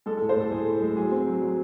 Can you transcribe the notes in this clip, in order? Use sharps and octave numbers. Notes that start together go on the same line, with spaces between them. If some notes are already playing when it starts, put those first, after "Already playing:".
G#3 A4
A2 A4
C5
A2 A4
A2 G#4
A2
G#3
F#3 G#4
C4
F#3
F#3